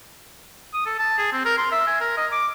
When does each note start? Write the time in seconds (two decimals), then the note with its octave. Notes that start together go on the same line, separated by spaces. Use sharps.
0.74 D#6
0.86 A4
0.99 A5
1.18 G#4
1.32 C4
1.45 A#4
1.58 C6
1.72 E5
1.87 G#5
2.01 A#4
2.17 D#5
2.32 D6